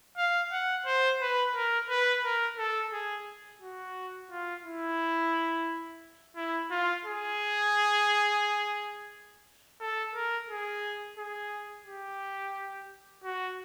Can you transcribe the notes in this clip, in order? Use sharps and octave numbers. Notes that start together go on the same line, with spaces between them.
F5
F#5
C5
B4
A#4
B4
A#4
A4
G#4
F#4
F4
E4
E4
F4
G#4
A4
A#4
G#4
G#4
G4
F#4